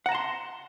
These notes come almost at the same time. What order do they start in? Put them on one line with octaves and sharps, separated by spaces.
F#5 A#5 A5 C6